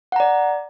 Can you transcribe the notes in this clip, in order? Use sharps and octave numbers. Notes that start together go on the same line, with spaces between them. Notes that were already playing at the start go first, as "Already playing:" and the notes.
D5 F#5 A#5